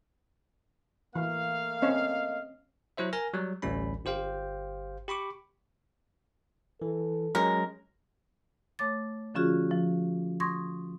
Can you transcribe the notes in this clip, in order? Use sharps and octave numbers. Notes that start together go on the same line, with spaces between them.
E3 A3 A#3 F5
C4 C#4 C#5 D#5
F#3 E4 C5 E5
A#4 G#5 F6 A#6
F#3 G3
A1 D2 G3 C#4 B5
G1 G4 C5 F5 G5
G4 B5 C#6 D6
E3 A4
F#3 G#3 C#4 A#4
A3 C#5 D6 A6
D3 F3 C#4 F4 F#4 G#4
F3
C6 C#6 D#6 G#6 A#6